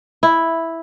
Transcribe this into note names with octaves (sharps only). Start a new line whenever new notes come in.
E4